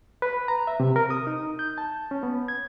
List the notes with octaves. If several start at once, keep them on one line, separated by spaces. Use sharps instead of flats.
B4
A#5
E5
C3
A#4
D#6
D#4
G6
A5
C#4
B3
G#6